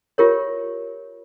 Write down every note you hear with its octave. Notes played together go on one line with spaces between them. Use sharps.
F4 G4 A#4 C#5